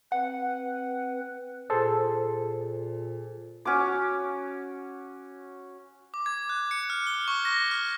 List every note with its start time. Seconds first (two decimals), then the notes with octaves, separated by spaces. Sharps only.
0.12 C4 B4 F#5
1.70 A#2 G#4 A4 C5
3.65 C#4 F#4 D6
6.14 D6
6.26 G#6
6.49 F#6
6.71 C#7
6.90 F6
7.07 G7
7.28 C#6
7.45 A#6
7.71 F6